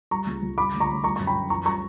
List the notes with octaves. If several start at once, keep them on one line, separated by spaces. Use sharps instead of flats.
G3 A#5 C#6
C#2
C#2
G3 B5 D6
D2
A#5 C#6
D2
G3 A#5 C#6
F#2 C#6
G5 B5
F#2
E3 A#5 C#6
G3 A#5 C#6